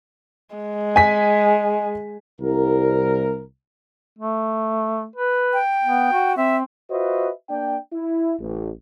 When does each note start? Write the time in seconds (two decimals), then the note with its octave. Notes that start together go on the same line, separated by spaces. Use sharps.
0.55 G#3
0.96 G#5 B6
2.41 C2 A#4
4.19 A3
5.16 B4
5.53 G5
5.83 B3
6.13 F#4
6.37 C4 E5
6.90 F4 F#4 B4 C5 D#5 E5
7.49 A#3 D4 D5 G5
7.92 E4
8.39 A1